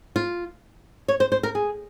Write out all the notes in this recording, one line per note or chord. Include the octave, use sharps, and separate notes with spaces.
F4
C#5
C5
C5
A#4
G#4